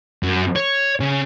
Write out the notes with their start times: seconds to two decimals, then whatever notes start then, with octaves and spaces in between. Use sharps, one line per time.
0.23 F#2
0.56 C#5
1.00 C#3